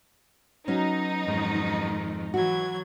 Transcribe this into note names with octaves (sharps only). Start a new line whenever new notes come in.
F#3 B3 C#4 D#4
F2 G#2 D#3
E3 F#3 F#4 G#6